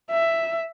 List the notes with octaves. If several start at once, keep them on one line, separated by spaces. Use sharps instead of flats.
E5